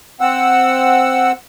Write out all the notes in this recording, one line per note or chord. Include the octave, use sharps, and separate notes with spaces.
C4 F#5 E6